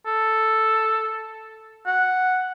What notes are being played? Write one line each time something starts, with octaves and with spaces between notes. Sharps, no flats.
A4
F#5